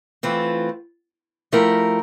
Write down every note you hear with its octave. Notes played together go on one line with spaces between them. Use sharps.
E3 A3 C4 F4
F3 A3 E4 G4 A#4